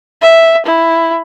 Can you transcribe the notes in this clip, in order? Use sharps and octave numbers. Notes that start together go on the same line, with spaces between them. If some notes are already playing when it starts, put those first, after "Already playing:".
E5
E4